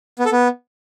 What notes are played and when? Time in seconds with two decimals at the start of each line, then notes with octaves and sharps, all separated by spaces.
0.19 B3
0.26 A4
0.32 B3